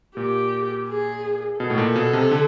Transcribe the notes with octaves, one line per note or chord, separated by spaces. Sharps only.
A#2 G4
G#4
B2 A4
A2
A#2
B2
C3
D3